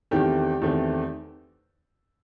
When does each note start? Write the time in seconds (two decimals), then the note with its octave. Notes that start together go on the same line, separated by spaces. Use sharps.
0.11 E2 D#3 A3 C4 G4
0.62 E2 D#3 A3 C4